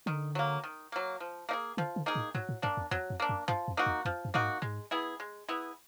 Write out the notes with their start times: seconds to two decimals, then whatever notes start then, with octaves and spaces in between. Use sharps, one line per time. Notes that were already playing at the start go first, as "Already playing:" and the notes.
0.06 D3 D#3
0.35 F#3 A#3
0.64 D#3
0.92 F#3 A#3
1.20 F3
1.49 A#3 D#4
1.53 G#4
1.77 D3 F3
1.96 D3
2.06 A#3 D#4 G#4
2.15 A2
2.35 G#2 F#3
2.49 A2
2.62 G2 A#3 D4
2.77 E2
2.91 E2 F#3
3.10 F2
3.20 A#3 D4
3.29 F#2
3.48 G2 F3
3.68 F2
3.77 A#3 D#4 F#4
3.86 E2
4.05 F2 F3
4.25 F#2
4.34 A2 A#3 D#4 F#4
4.44 G#2
4.62 G#2 G#3
4.91 B3 E4 G#4
5.20 G#3
5.49 B3 E4 G#4